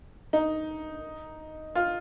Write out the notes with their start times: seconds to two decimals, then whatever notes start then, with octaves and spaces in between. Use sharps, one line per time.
0.33 D#4
1.75 F4